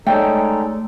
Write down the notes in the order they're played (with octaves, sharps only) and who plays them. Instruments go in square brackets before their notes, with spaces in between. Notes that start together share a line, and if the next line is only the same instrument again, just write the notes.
[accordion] G#3 D#4 A4 [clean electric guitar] A3 C#5 D5 [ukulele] G5